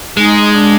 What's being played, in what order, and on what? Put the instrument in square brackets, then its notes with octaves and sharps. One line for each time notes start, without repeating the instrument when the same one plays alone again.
[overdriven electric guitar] G#3 [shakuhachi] D#4
[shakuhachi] D4